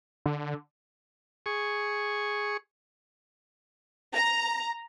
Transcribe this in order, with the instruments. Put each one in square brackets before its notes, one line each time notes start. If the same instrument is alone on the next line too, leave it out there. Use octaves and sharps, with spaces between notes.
[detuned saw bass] D3
[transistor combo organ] G#4 C#6
[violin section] A#5